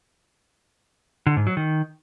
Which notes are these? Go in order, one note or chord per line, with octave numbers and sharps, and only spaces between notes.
D3
G#2
F#3
D#3